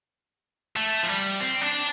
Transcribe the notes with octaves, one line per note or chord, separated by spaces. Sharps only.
A3
F3
G3
C4
D4